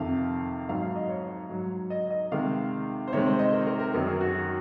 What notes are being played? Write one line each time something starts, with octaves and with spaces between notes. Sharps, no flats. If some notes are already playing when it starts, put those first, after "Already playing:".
Already playing: F2 C3 D#3 F5
G#2 F#3 F5
F5
D#5
C#5
G#2 F#3
D#5
D#5
C3 D#3 G#3 F5
C5
C3 D#3 G#3 C#5
C5
D#5
A#4
A#4
A#4
F#2 D#3 F#3 A#4
G#4
F#4
F#4